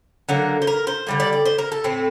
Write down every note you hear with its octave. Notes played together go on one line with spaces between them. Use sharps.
D3 F#3 A#3
C5
A#4
C5
D3 G3 A#3
D5
D5
C5
A#4
A4
A2 A3 C4